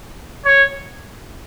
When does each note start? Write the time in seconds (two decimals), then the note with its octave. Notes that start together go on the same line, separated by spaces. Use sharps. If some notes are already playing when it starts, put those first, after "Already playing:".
0.45 C#5